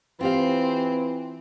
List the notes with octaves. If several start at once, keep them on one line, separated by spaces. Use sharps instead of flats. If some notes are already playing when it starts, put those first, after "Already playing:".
E3 C4 F4 G4 F5